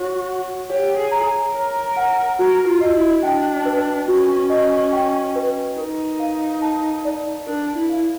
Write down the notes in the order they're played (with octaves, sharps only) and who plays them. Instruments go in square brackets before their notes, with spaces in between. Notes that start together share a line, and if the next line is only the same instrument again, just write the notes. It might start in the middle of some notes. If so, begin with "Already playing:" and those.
Already playing: [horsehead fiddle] F#4 [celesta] C#5
[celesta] F#5
[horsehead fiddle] G4 [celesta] C#5
[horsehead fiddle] G#4
[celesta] A#5
[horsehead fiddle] A#4 [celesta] C#5
[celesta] F#5
[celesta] F#4 [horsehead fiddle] A#4
[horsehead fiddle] F4
[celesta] D#5
[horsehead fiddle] E4
[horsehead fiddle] D4 [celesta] G5
[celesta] B4
[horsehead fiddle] C#4 [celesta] F#4
[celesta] D#5
G5
B4
[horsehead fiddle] D#4 [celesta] A#4
[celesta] F5
A5
D5
[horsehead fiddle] D4 [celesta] A#4
[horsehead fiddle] E4
[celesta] F5